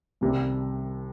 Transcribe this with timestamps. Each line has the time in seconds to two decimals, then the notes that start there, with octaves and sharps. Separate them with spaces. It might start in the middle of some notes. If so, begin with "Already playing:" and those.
0.21 C2 C3 D#3 G3